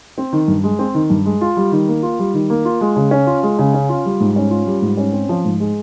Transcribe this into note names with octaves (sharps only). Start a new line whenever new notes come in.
C4
D#3
G2
G#3
C4
D#3
G2
G#3
F4
G3
D#3
A#3
F4
G3
D#3
A#3
F4
G#3
C#3
C#4
F4
G#3
C#3
C#4
F4
G3
G#2
C#4
F4
G3
G#2
C#4
C4
F3
G#2
G#3